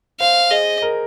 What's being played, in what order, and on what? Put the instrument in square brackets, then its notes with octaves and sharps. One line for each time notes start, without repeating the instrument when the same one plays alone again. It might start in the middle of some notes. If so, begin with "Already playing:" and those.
[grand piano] C5 [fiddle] F5
[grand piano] G#4 [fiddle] D#5
[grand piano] A#4